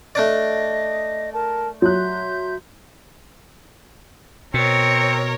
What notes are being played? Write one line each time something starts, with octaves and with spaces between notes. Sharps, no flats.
A3 D4 D5 D#5
A#4 A5
F#3 E5 C6 F#6 G6
B2 C4 A#4 C#5 C#7